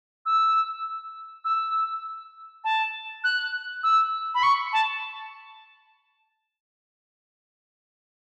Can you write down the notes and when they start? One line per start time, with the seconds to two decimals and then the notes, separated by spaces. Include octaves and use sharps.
0.26 E6
1.45 E6
2.64 A5
3.24 F#6
3.83 E6
4.34 B5
4.43 C#6
4.73 A5